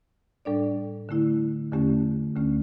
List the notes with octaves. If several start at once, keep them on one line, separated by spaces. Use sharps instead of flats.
A2 G3 D4 A4 D5
D3 A3 E4
E2 D3 A3 C#4 G4
D2 D3 A3 C#4